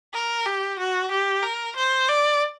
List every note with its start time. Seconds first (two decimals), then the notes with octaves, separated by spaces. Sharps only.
0.13 A#4
0.46 G4
0.79 F#4
1.11 G4
1.43 A#4
1.76 C5
2.09 D5